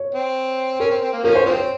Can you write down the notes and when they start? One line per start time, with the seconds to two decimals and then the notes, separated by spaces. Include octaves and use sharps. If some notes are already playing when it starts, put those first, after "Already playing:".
Already playing: C#5
0.15 C4
0.80 C#4 A#4
0.91 C4
1.02 C4
1.13 A#3
1.24 F3 A#3 C#4 A#4
1.35 C5
1.46 F3 C4 C5
1.57 C#5